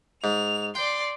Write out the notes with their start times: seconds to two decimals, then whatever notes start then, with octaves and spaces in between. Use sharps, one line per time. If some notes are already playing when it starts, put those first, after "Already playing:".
0.24 G#2 F7
0.75 D5 G5 C6